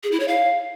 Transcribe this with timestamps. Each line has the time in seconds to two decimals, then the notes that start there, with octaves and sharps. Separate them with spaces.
0.04 G#4
0.12 E4
0.20 C#5
0.28 F5